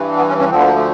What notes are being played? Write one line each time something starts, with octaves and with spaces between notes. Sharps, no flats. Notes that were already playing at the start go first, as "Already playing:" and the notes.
Already playing: G2 E3
B3
C#4
C#4
D2 D3 F3 C4
B3
A#3
A3